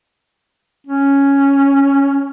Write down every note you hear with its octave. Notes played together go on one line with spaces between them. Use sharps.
C#4